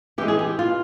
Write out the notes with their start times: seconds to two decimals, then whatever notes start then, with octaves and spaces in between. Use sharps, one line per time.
0.18 E3 G#3 G4
0.28 G#4
0.39 G4
0.59 F4